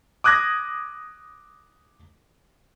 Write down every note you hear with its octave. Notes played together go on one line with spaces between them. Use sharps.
D6 D#6 F#6 G#6 A#6